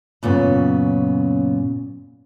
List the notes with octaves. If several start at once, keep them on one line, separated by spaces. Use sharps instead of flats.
F#2 A#2 C#3 B3